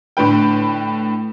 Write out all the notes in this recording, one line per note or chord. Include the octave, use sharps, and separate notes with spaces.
A2 D3 B4 G5